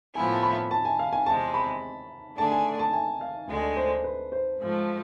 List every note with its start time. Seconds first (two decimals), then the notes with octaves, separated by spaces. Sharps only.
0.15 A2 F3 B3 E4 G#5
0.32 A5
0.43 B5
0.71 A5
0.85 G#5
0.99 F5
1.13 G#5
1.26 E2 C3 G#3 A5
1.54 B5
2.38 D3 A3 D4 G#4 A5
2.52 G#5
2.79 A5
2.93 G#5
3.21 F5
3.48 D2 D3 G#3
3.77 C5
4.04 B4
4.32 C5
4.60 G#2 F3 A3